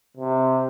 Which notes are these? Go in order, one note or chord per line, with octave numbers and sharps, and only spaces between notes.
C3